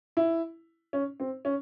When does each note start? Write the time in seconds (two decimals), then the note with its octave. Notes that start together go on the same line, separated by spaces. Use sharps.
0.17 E4
0.93 C#4
1.20 C4
1.45 C#4